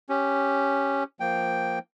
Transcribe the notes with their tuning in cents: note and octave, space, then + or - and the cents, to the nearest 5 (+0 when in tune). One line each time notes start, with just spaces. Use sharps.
C#4 +0 G4 +0
F3 +0 A#3 +0 G5 +0